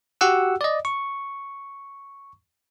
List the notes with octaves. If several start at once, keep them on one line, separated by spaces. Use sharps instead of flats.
F#4 G4 F#5 E6
D5 D#5
C#6